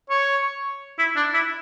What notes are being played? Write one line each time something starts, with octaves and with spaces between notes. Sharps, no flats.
C#5
E4
D4
E4